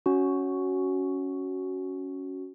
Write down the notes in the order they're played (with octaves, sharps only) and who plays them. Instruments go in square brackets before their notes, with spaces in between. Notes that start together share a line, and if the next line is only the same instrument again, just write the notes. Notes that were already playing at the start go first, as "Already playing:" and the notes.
[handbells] C#4 F#4